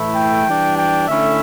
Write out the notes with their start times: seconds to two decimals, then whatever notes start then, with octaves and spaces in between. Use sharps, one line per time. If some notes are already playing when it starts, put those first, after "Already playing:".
Already playing: A2 E3 A3 E4
0.14 G5
0.46 E3 G3 D4
0.77 G5
1.08 D3 A3 C#4 E4 E5